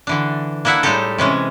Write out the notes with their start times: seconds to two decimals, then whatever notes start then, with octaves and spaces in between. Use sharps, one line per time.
0.07 D3 E3 D4
0.65 A#3 D4 E4 E5 F#5
0.83 A2 G3 G#3 D#4 G4 A4
1.18 C3 E3 G#3 C#4